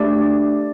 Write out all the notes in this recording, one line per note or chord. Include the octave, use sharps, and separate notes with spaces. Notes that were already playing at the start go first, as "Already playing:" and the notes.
Already playing: A3 D4 G4 D5